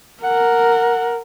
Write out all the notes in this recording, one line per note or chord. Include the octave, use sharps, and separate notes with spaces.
A#4 F#5